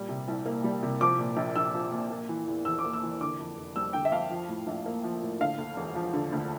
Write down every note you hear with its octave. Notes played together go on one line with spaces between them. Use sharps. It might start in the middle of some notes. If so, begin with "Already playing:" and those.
Already playing: A#2 G3
C3
C2
A#3
G3
C3
F3 D6
A#2
A#1
A#1 E6
F3
A#2
A#3
E3
E2
E2 E6
D6
A#3
E6
E3
D3 D6
F2
F1
G3 E6
D3 G5
E5
F2 F5
F3
A2
A#1
A#3
F3
A2
D3 F5
D2
E1
F3
D3
D2